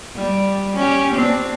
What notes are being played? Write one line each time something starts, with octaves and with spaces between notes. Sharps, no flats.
G3
C#4 G4
C4 D4